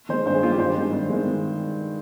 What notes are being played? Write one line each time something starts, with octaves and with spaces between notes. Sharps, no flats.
D#3 G#3 C5
G2 C5
G#4
D#3 G#3 F4
G4
G2 C5
D#3 G#3
G2
D#3 G#3